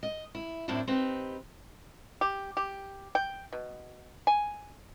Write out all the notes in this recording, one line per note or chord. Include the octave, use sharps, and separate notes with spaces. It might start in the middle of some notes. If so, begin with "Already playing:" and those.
D#5
E4
F#2 A2 C4 D4 E4
C4 D#4 G4 B4
G4
G4
G5
B2
G#5